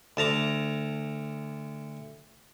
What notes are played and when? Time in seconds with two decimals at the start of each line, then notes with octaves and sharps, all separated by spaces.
0.17 D2 A5 A#5 D6